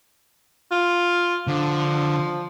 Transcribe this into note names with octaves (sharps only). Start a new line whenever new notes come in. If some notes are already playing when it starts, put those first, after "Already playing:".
F4
D3 F3